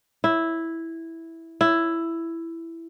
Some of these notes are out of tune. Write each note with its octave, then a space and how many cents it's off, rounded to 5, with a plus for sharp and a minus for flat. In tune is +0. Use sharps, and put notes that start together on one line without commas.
E4 -5
E4 +10